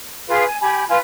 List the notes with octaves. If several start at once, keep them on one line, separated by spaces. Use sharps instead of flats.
F4 G#4 B4 F5
G#5
G4 G#5 B5
F4 B4 G#5